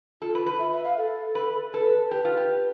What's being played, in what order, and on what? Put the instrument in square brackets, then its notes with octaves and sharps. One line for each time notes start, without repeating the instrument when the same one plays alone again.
[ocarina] F4 [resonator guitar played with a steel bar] A4
[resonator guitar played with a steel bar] B4
B4
[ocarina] E5
E5
F5
A4
[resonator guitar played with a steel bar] B4
[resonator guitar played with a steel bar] A4 [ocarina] B4
[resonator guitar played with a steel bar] G4 [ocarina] B4
[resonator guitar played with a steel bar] F4
G4